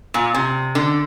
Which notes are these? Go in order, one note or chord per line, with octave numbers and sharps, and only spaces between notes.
A#2
C3
D3